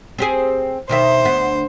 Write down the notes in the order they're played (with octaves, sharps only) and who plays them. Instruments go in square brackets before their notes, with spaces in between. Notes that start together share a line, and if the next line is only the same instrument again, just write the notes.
[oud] C4 G4 G#4
[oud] B2 D#3 E5 [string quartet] C5
[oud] D2 B3